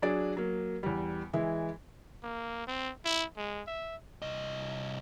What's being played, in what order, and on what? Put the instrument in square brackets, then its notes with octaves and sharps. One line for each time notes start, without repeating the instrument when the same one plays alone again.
[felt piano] F#3 D4 G#4 D5
F#3 A#3
E2 G3
E3 G#3 E4
[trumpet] A#3
C4
E4
G#3
E5
[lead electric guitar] C2 D#5